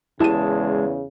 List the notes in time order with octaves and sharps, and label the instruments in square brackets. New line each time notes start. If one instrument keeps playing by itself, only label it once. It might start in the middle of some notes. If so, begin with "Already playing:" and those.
[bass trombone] E2 [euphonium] C#3 [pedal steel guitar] G#3 A5 [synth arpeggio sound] E4 G4 D#7